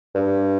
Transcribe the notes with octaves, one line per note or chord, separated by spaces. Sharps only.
G2